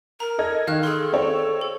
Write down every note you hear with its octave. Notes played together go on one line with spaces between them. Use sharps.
A#4 A#5
A4 D#5 G#6
D#3 F5 F6 F#6
G#4 A4 C6
C4 C#5
A4